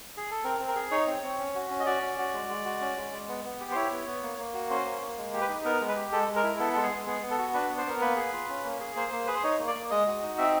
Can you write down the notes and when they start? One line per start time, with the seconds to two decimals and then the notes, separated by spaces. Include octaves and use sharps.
0.17 G#4
0.31 A4
0.44 C4 A#4
0.60 C4
0.68 A#4
0.76 G#4
0.91 D#4 C#5
1.07 C4
1.23 C4
1.39 C#4
1.55 F#4
1.71 C#4
1.80 D#5
1.86 F#4 D5
2.02 C#4
2.18 F#4
2.34 G#3
2.49 G#3
2.65 F#4
2.81 C#4
2.97 G#3
3.12 G#3
3.28 B3
3.45 B3
3.60 G4
3.71 C5
3.75 E4 C#5
3.92 B3
4.07 B3
4.23 A#3
4.38 A#3
4.54 F#4
4.70 C#4 C5
4.85 A#3
5.02 A#3
5.17 G#3
5.33 G4
5.41 B4
5.49 D#4
5.65 B3 A#4
5.81 G#3
5.88 B4
5.96 G4
6.12 G#3 A4
6.28 G#3
6.36 A#4
6.44 E4
6.59 B3 A4
6.73 G#3 A4
6.83 G#4
6.91 G#3
7.07 B3 G#4
7.23 B3
7.30 A4
7.38 F#4
7.54 D4 B4
7.69 B3
7.78 C5
7.86 B3 A#4
8.01 A#3 B4
8.17 G#4
8.33 F4
8.49 C#4
8.65 A#3
8.80 G#4
8.96 A#3 C5
9.12 A#3
9.27 G#4 B4
9.35 C5
9.43 D#4 C#5
9.59 A#3
9.67 D5
9.75 A#3
9.91 G#3 D#5
10.07 F#4
10.22 D#4
10.38 C4 E5